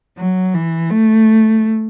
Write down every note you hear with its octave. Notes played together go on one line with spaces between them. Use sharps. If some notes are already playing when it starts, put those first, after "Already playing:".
F#3
E3
A3